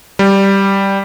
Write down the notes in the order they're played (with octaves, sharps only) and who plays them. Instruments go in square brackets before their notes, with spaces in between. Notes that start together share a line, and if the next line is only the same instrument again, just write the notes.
[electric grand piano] G3